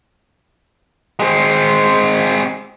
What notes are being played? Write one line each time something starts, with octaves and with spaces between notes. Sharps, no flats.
G#3 C4